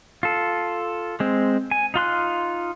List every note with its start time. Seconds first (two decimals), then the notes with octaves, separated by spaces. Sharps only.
0.23 F4 A4
1.20 G#3 C4
1.71 G#5
1.94 D#4 F4 C6 F#6